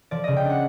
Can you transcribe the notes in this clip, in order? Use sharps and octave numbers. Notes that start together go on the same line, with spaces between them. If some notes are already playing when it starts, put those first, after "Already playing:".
F3 D5
C#3 D#5
G5
D4 F#5